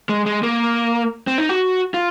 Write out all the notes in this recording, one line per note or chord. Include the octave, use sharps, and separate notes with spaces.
G#3
G#3
A#3
C4
D#4
F#4
F4